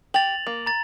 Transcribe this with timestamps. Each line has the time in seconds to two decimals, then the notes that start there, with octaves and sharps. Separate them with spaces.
0.14 G4 A6 F7 F#7
0.47 A#3
0.66 A#5 A6